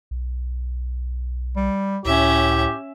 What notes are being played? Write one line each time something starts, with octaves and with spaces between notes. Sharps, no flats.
B1
G3
C#2 A2 C#4 G4 E5